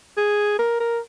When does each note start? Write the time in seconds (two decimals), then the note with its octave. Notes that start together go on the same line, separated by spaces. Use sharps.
0.17 G#4
0.59 A#4
0.80 A#4